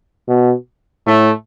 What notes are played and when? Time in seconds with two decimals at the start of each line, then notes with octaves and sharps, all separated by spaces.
0.28 B2
1.07 A2 A3